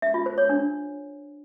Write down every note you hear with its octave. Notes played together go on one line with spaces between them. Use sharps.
E5
F4
C5
C#5
D4